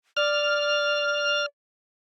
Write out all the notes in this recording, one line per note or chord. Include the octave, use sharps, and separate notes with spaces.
D5 F6